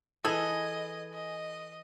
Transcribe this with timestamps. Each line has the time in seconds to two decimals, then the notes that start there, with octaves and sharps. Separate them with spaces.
0.25 E3 G#4 A4 B4 D#5 G#5
1.13 D#5